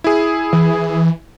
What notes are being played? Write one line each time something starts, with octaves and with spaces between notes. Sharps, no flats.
E4 G#4
E3